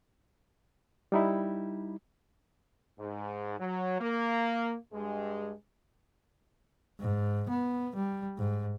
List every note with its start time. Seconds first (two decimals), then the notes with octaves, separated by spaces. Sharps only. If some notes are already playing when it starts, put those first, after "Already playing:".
1.12 G3 D#4 E4
2.99 G#2
3.59 F#3
4.00 A#3
4.93 G2 G#3
7.00 G#2
7.49 B3
7.96 G3
8.38 G#2